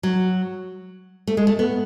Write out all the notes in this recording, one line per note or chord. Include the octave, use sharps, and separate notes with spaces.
F#3
A3
G#3
A3
B3